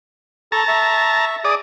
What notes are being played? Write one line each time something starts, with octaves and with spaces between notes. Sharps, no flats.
A4 A5 A#5 C#6
E5 C#6
G#4 D5 D6 D#6